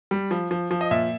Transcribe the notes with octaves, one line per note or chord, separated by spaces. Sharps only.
G3
F3
F3
F3
D#5
A#2 E5